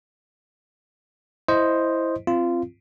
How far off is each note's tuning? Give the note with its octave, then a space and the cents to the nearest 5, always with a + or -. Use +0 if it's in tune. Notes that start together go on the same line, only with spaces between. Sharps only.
E4 +0 C5 +0 D#5 +0
C4 +0 F4 -20